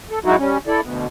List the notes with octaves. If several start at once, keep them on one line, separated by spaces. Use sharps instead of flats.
A4
F#3 G#3 D#4 E4 F#4
G3 C#4
E4 A4 D5
D2 B2